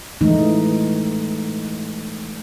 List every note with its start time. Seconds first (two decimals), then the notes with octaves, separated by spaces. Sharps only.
0.21 E3 G#3 A3 D#4